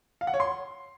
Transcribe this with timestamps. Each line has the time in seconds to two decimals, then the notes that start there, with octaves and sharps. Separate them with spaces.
0.21 F5
0.27 F#5
0.34 C#5
0.40 C6